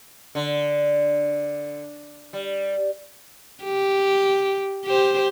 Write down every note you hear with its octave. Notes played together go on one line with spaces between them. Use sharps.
D3
G3
G4
G4 C5